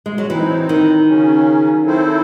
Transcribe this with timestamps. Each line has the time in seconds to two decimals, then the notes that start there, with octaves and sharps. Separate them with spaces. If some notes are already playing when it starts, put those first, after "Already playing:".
0.06 G#3
0.18 F#3
0.30 E3 F#3 C4 D#4
0.69 D#3
1.07 C#3 F#3 C#4
1.85 F#3 C4 E4 A4 C5